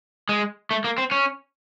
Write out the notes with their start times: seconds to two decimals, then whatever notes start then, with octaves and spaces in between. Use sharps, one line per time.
0.29 G#3
0.71 A3
0.84 A#3
0.98 C4
1.11 C#4